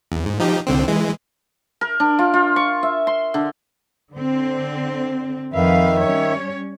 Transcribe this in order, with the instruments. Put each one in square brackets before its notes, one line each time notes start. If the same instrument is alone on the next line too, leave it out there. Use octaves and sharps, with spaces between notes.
[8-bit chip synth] E2
G#2
F3 D#4 G4
C2 D3 C4
E3 G#3
[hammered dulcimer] A#4
D4
F4
F4
C#6
E5
C6
D3
[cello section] D3 C4
[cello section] F2 B4 F5 [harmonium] D#3 E5
[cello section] G3 C#4 C#5